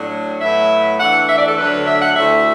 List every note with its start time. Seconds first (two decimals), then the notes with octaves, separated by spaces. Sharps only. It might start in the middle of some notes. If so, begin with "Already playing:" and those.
Already playing: A2 F#3 D4
0.41 A2 F#3 B3 E4 E5
1.00 E2 E3 A3 D4 F#5
1.29 E5
1.38 D5
1.48 A4
1.58 D2 D3 F#3 D4 B4
1.87 E5
2.02 F#5
2.16 D2 D3 A3 E4 E5